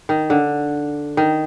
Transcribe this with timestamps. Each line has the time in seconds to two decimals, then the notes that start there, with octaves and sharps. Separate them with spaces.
0.09 D#3
0.30 D3
1.17 D#3